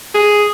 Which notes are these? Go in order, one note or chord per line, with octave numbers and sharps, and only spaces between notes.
G#4